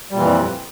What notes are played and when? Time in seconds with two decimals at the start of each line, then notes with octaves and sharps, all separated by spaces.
0.11 G3
0.14 A#2
0.18 E3
0.22 F2